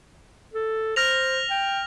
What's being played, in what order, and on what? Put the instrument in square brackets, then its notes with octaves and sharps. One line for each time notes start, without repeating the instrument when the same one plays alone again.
[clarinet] A4
[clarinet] C5 [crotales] F6 A#6 F7
[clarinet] G5